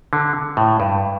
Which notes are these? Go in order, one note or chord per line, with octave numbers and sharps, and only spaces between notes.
D3
A2
G2